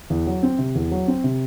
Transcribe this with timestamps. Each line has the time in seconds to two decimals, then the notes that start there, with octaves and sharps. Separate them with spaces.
0.10 E2
0.27 F#3
0.43 C4
0.59 C3
0.75 E2
0.91 F#3
1.08 C4
1.24 C3